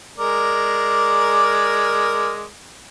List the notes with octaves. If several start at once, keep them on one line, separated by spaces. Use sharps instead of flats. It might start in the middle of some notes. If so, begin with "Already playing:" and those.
G#3 A#4 D5